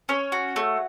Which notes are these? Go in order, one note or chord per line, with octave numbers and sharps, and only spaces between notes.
C#4 C#5
F#4
A3